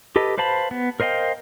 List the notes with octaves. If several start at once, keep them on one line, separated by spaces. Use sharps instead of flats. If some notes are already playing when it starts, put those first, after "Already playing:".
G4 A4 B4 D#5
B4 C5 F5 A5 B5
B3
A#4 C5 D#5 F5 G5